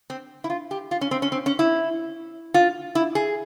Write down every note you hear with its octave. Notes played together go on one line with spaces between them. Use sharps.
C4
E4
F4
G4
F4
C#4
C4
C#4
C4
C#4
E4
F4
E4
G#4